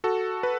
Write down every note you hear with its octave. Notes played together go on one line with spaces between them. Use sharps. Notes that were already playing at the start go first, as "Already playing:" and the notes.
F#4 A4
B4